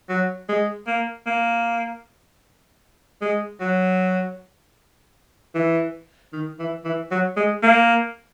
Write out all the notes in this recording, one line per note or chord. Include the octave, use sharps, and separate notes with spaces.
F#3
G#3
A#3
A#3
G#3
F#3
E3
D#3
E3
E3
F#3
G#3
A#3